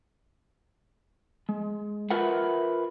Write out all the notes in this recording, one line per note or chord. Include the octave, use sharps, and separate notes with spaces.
G#3
F4 A#4 B4 E5 F#5